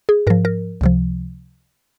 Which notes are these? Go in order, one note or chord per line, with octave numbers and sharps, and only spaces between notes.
G#4
G#2 F3 A#4
A#4
C#2 C3 F3